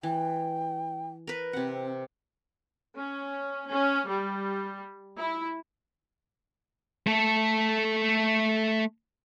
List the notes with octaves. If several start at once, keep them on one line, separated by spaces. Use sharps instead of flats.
E3 G5
A#4 B4
C3 C4 F#5
C#4
C#4
G3
E4
A3 A4